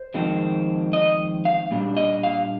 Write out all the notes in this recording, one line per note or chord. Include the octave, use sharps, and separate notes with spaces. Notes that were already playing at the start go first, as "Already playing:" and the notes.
Already playing: C5
F2 D#3 G#3 C4
D#5
F5
A#2 G3 D4
D#5
F5